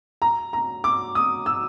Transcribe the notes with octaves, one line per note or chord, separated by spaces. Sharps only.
A#5
A#5
D6
D#6
E6